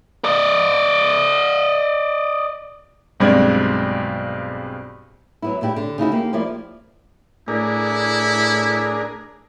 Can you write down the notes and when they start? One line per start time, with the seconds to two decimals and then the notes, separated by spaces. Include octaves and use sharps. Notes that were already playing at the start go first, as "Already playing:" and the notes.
0.25 D5 D#5
3.20 B1 G2 G#3 C4 D5 G#6
5.42 F#3 B3 E4
5.61 A#2 D4 E4 G4
5.76 D3
5.98 C#3 D#4 E4 F#4
6.12 A#3 G4
6.33 F3 A#3 E4 D5
7.48 A2 D4 E4 G#4 A#4